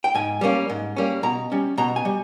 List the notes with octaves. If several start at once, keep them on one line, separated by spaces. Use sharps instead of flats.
G5
G#2 G#5
G3 A#3 C#4
G#2
G3 A#3 C#4
B2 A#5
G3 C#4
B2 A#5
G#5
G3